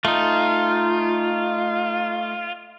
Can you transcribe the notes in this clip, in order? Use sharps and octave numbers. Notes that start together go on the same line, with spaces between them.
A3 D#4 F4